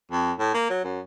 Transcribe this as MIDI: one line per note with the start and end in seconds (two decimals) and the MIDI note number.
0.12 0.32 41
0.39 0.53 45
0.54 0.70 58
0.70 0.84 54
0.84 1.00 42